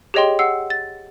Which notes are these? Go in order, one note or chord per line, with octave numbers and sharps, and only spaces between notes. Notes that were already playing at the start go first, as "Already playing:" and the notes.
G4 G#4 C#5 D#5 G5 C6
F#5 E6 C7
A6